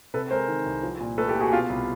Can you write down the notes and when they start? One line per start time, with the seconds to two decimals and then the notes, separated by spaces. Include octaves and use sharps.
0.14 C3 A4 B4
0.31 G#3 A#4 C5
0.48 D#3
0.66 C2
0.83 F3
1.00 A#2
1.18 A3 A4 B4
1.29 G4 A4
1.35 A#2
1.40 F#4 G#4
1.52 B2 F4 G4
1.70 C2